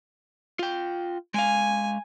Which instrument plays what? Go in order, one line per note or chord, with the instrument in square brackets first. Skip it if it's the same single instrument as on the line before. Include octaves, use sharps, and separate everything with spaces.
[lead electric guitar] F4 G5
[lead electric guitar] G#3 F5 [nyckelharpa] G#5